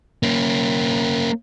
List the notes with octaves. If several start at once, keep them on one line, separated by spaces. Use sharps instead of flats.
A#3 C#4